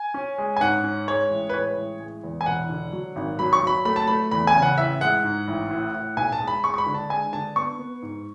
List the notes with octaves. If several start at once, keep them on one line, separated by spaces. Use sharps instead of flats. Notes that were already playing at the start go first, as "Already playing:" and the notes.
Already playing: G#5
C#4
G#3
G#5
G#2 F#5
C#4
G#3 C#5
A1
B4
G#3 C#5
A1
G#3
E2
G#5
E1 F#5
D3
F#3
G#1
F#3 B5
C#6
F#3 B5
A3 B5
A5
A3 B5
E2 B5
G#5
C#3
F#5
A1 E5
G#3 F#5
G#2
A1
A2
A2
B1 G#5
A5
G#3
B5
G#3 C#6
C#6
B5
D3
A5
G#3 G#5
D3 A5
B3 C#6
B3
G#2